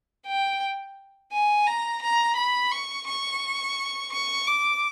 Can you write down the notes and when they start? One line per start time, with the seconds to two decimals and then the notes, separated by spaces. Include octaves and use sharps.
0.26 G5
1.32 G#5
1.67 A#5
2.02 A#5
2.36 B5
2.72 C#6
3.07 C#6
4.12 C#6
4.48 D6